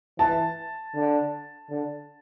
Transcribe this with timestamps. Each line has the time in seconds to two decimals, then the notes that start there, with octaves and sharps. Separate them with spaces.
0.19 E3 A5
0.95 D3
1.70 D3